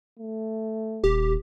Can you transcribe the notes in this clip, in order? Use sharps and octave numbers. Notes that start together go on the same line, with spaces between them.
A3
D#1 G4